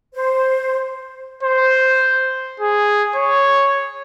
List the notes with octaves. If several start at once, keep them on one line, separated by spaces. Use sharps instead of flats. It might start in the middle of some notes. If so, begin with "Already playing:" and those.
C5
C5
G#4
C#5